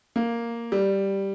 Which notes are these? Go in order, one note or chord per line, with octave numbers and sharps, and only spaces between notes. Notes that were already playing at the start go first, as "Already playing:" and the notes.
A#3
G3